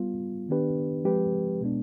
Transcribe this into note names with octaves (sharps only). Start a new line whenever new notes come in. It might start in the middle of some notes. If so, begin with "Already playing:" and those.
Already playing: G3 B3 F4
D#3 B3 D4 G4 B4
F3 G#3 C4 G4 B4
B2 G#3 B3 D4